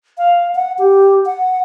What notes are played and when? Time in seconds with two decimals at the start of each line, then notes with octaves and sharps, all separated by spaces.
0.18 F5
0.55 F#5
0.78 G4
1.26 F#5